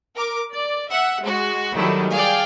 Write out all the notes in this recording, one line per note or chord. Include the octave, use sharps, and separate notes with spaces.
A#4 D6
D5
E5 F#5
G#3 F#4
D#3 F#3 G3 A3 E4
G#4 D5 F5 G5